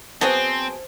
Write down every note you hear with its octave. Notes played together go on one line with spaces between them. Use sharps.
F#3 B3 C4 G#4 C5 A5